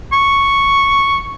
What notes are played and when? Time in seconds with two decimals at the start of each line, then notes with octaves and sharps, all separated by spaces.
0.13 C#6